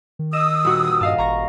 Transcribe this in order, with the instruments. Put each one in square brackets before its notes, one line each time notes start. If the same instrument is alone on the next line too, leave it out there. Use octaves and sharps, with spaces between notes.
[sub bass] D#3
[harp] D#5 E7 [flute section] D#6 E6
[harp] D#1 F#4
[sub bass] G2 [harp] D#5 F5 A5
[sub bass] G#1 [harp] A#5 C#6 A#6